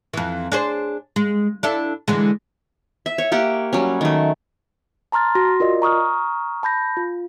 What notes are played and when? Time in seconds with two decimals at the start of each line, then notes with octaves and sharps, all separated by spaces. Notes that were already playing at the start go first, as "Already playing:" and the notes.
0.13 F2 E3
0.52 D4 G#4 C5
1.16 G#3
1.63 D4 E4 A4
2.08 D3 E3 G#3
3.06 E5
3.18 C#5
3.32 A#3 G4 F#5
3.73 F#3 G3 C#4
4.01 D#3 A3
5.12 A5 A#5 C6 F6 A6
5.35 F#4 C6 A#6
5.60 F4 A#4 D5 D#5
5.82 A#5 C#6 D#6 F6
6.63 A5 B5 G6 A#6
6.97 F4